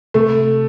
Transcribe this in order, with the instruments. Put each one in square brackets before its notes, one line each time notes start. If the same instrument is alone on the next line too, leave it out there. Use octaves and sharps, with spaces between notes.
[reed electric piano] C3 [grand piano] A3